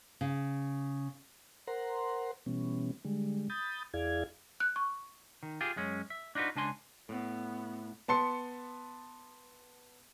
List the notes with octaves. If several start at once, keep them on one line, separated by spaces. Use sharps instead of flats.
C#3
A#4 C5 F#5 A#5 C6
B2 E3 G3 B3 C#4
D3 G3 G#3
B5 D#6 G6 A6
E2 E4 G#4 D5 F5 G#6
F#6
C#6
D#3
F4 G4 G#4
F#2 G#3 C#4
E5
D4 D#4 F4 F#4 B4
C#2 D4 G#5 C6
A2 B3
B3 A5 C6 C#7